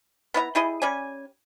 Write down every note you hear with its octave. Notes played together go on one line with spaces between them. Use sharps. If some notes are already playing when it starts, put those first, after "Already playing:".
B3 E4 D#5 A#5
G3 E4 G#4 D#5
G3 C#4 D5 G#5